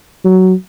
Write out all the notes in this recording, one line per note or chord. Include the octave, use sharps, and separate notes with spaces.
F#3